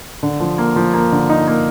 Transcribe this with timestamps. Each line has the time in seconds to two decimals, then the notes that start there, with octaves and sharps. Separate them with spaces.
0.23 D3
0.40 F3
0.58 A#3
0.76 F3
0.94 A#3
1.12 D3
1.29 D#4
1.47 A#3